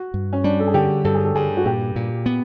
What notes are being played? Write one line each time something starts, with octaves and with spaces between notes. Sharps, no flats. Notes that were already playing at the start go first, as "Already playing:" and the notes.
Already playing: F#4
G2
C#4
G3 D4
A4
G#4
D3 G4
G2 A4
G#4
A4
G2 G#4
F#4
A#2 G4
A#2
B3